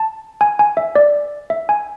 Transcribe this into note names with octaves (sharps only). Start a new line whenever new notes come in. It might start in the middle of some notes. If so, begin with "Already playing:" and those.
Already playing: A5
G#5
G#5
E5
D5
E5
G#5